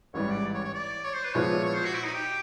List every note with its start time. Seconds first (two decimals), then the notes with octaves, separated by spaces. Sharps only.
0.14 A1 G#2 E3 G3 C#5
0.29 D5
0.54 C#5
0.64 C#5
0.74 D5
1.04 C#5
1.14 C5
1.24 B4
1.34 A#2 F3 G#3 B3 E4 C#5
1.64 C#5
1.74 C5
1.85 F#4
1.94 E4
2.04 D#4
2.14 G4